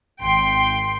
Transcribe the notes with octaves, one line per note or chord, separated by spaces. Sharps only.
G#1 G5 C6